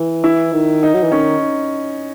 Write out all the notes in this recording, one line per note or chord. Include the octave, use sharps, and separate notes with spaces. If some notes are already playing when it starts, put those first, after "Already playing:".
Already playing: E3
E4
D#3
D#4
F#3
E3
D#3 C#4